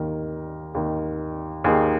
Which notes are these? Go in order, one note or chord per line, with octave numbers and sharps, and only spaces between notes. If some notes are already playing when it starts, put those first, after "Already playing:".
Already playing: D#2 D#3 A#4
D#2 D#3
D#2 D#3 G#4